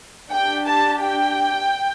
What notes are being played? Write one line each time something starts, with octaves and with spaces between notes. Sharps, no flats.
D4 G4 G5
A5
G5